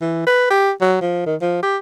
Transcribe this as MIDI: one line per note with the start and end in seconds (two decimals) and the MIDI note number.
0.01 0.26 52
0.27 0.48 71
0.50 0.71 67
0.81 0.97 54
1.01 1.23 53
1.26 1.35 51
1.41 1.61 53
1.63 1.77 67